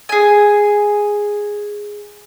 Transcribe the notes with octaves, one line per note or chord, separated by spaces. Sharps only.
G#4 G#5